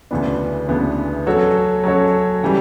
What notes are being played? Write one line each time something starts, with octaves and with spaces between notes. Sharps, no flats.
D2 C#3 E3 B3 D4
D2 C#3 E3 B3 D4
F#3 C#4 F#4 A4 C#5
F#3 C#4 F#4 A4 C#5
C#3 E3 G3